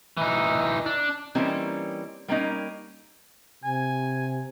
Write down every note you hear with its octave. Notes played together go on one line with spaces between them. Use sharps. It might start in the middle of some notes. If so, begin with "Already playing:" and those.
E3 D#4
D4
E3 G3 A#3 C4 C#4 D#4
G3 A#3 C#4 D#4
C3 G#5